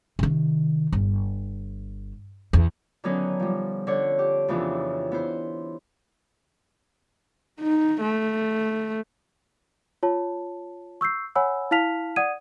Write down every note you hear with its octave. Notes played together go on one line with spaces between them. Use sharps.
C3 D#3
G1
E2
D3 D#3 F#3 B3 C#4 D#4
F3 G3
D3 D4 C#5 F#5
G4
F2 C#3 E3 F3 B3 D4
B3 E4 C5
D#4
A3
F4 C#5 A5
C#6 E6 G6 C7
C#5 F#5 G#5 B5 E6
E4 F5 A5 F6 B6 F7
D5 F#5 D#6 G#6 D#7